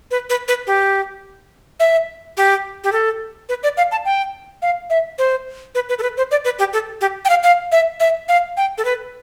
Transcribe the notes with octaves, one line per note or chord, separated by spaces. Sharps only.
B4
B4
B4
G4
E5
G4
G4
A4
B4
D5
F5
A5
G5
F5
E5
C5
B4
B4
A4
B4
C5
D5
B4
G4
A4
G4
G5
F5
F5
E5
E5
F5
G5
A4
B4